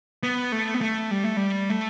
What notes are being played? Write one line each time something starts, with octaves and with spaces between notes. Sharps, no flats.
B3
A3
B3
A3
G3
A3
G3
A3